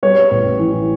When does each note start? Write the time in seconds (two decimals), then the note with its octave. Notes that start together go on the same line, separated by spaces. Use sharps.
0.03 G3 B4 C#5
0.31 A1
0.59 E3